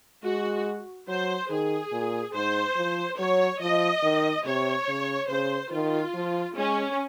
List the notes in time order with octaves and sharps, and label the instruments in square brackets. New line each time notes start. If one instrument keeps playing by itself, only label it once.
[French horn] G#3 [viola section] F#4
[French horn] F#3 [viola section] C5
[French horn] D#3 [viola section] G#4
[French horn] A#2
[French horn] G#2 [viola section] C5
[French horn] F3
[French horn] F#3 [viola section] C#5
[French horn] F3 [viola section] D#5
[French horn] D#3
[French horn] C3 [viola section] C#5
[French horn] C#3
[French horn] C#3 [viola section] C5
[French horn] D#3 [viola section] F4
[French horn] F3
[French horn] G#3 [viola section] C#4